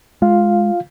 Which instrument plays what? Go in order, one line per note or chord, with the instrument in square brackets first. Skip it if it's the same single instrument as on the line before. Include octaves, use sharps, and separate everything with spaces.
[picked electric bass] G#3 [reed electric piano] F4 F5